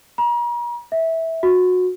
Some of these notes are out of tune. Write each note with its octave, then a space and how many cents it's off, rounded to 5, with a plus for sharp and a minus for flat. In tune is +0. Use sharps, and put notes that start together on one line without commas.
A#5 +40
E5 -15
F#4 -25